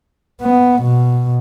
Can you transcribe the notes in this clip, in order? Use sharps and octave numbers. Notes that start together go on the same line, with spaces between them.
B3
B2